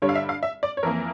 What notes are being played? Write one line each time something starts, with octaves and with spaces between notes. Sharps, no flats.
G2 D3 G3 C#5
F5
E5
F5
E5
D5
C#5
F2 E3 A#3 A#4